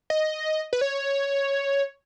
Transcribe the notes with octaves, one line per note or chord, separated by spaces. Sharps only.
D#5
B4
C#5